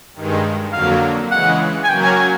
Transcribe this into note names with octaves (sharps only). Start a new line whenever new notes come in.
G2 D#3 G#3
F2 D3 F#3 A#3 F5
C#3 E3 G#3 F#5
G#5
F#3 A#3 C#4 F#4 A#4 G5
G#5
G#5